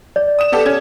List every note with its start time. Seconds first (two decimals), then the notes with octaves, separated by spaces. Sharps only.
0.16 D5
0.39 D#6 E7
0.52 B3 G4 A4
0.66 C#4 G#6